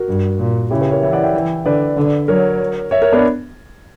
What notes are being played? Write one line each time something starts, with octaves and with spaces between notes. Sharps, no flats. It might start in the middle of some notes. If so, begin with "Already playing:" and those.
Already playing: F#4 A#4
G2
A#2
C#3 E4 G4
G4 B4
A#4 C#5
E3 C#5 E5
D5 F#5
E5 G5
E3
D3 B4 D5
D3
F#3 A#4 C#5
C#5 E5
A#4 C#5
B3 D4